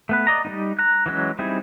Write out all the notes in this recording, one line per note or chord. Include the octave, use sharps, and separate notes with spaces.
A3 B3 B4
D5 D#5 A#5
G3 A#3 D#4
A#5 F#6
E3 F#3 G#3 C#4
G3 C4 D#4 E4 G#4